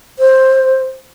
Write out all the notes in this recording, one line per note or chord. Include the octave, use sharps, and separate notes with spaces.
C5